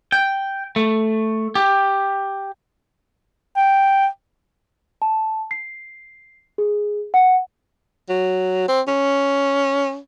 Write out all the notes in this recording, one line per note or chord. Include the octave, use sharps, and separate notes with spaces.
G5
A3
G4
G5
A5
C7
G#4
F#5
F#3
C4
C#4